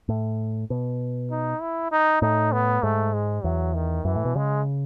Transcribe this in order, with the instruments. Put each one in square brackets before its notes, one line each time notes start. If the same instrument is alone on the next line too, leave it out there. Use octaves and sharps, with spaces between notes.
[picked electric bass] A2
B2
[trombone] D#4
E4
D#4
[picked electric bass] A2 [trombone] D#4
[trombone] B3
[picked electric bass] G#2 [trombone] A3
[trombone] G#3
[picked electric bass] E2 [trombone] F#3
[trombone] D#3
[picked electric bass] F#2 [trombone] E3
[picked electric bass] A2
B2
[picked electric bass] C#3 [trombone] G#3